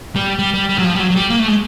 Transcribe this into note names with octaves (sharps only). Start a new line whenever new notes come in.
G3
G3
G3
G3
F#3
F3
G3
F#3
F#3
G3
A#3
A3
G#3